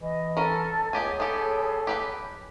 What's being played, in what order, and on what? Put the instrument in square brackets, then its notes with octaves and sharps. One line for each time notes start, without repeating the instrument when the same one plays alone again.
[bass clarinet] E3 [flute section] D#5
[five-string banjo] C#4 A#4 [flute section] A4
[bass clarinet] C#2 [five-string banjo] B3 G4 G#5 [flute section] G#4 C#5
[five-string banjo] B3 G4 [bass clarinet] A4
[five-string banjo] G4 B4 G5